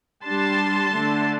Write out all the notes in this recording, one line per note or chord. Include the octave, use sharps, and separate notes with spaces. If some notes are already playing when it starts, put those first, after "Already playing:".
G3 D4 A5 C6
D3 A3 D4